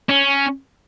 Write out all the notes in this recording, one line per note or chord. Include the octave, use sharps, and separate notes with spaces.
C#4